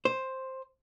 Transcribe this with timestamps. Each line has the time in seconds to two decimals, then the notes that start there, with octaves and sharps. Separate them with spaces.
0.05 C5